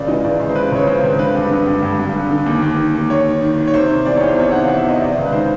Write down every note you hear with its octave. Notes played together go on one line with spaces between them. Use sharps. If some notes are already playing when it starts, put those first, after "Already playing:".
Already playing: C#2 C#3 D5
E3 D#5
C#2 D5
C#2
C5
C#3 B4
C#2 C#5
C#3 C5
C#2
D3 B4
G2
D3
G2
G2
G2
D3
D3
D#2
D#2
D#3
D#2
D#3 C#5
D#3
D#3
D#3
C#5
C3 C5
D#3
E2 D5
E2 C#5
C5
C3 C#5
D#3 F#5
E2 F5
E5
C3 D#5
C3 D5
C#2
B4
D#3 C5